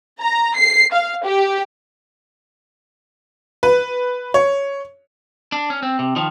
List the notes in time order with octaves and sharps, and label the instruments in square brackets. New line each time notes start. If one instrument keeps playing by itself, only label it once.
[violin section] A#5
C7
F5
G4
[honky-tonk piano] B4
C#5
[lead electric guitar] D4
C#4
C4
C3
D#3 F3